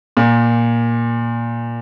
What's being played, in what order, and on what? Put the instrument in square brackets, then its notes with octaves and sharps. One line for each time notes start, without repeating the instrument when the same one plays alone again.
[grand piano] A#2